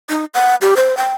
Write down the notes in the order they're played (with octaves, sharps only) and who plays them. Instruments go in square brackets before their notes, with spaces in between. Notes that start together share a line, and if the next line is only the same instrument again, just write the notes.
[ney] D#4
F#5
G4
C5
G5